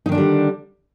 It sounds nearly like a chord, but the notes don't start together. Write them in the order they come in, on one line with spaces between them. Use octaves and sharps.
D#4 D#3 D4 D3 G3